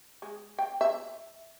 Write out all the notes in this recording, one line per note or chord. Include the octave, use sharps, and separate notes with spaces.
G#3
G5
E5